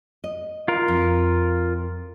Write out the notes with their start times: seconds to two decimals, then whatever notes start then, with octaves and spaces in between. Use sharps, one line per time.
0.24 D#5
0.68 F4 A#4
0.88 F2